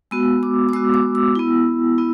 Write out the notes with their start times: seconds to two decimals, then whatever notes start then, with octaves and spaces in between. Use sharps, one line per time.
0.11 G#3 B3 F#4 E6
0.43 D6
0.69 D6
0.73 G#3 B3 F#4 E6
0.94 D6
1.15 E6
1.35 B3 E4
1.98 B3 E4